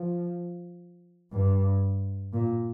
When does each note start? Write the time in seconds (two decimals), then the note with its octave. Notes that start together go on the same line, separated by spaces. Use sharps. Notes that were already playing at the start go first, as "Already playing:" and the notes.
Already playing: F3
1.33 G2
2.33 A#2